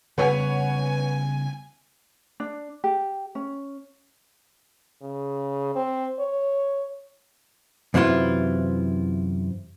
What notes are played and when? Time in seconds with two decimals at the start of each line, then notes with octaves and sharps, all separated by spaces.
0.18 C#3 G3 B3 B4 C#5 F#5 G#5
2.40 D4
2.84 G4
3.35 C#4
5.02 C#3
5.75 C4
6.19 C#5
7.94 F#2 C3 E3 E4 F4